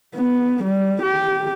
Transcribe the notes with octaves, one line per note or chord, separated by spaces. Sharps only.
B3
G3
G4